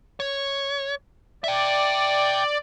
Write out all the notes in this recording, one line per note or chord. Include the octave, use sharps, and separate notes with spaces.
C#5
D5 E5 G5